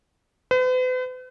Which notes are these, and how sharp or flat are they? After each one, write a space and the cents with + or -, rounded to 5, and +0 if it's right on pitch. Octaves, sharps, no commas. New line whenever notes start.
B4 +45